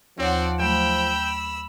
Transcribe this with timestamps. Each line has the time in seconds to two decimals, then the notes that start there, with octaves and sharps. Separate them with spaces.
0.19 D#2 F3 C4 C#5 D5 F#5
0.60 F#3 A3 G5 B5 E6